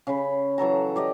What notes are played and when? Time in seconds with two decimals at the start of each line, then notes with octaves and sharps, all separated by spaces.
0.07 C#3 B5
0.58 E3 F#3 A4 A#5
0.96 G4 D5 D#5